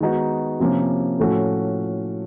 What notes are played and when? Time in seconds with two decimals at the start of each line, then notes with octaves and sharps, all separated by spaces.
0.01 D#3 G#3 B3 D#4 F#4
0.60 C3 F3 A#3 C#4
1.19 A2 F3 A3 C#4 F#4